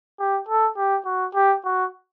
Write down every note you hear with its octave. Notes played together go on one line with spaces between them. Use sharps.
G4
A4
G4
F#4
G4
F#4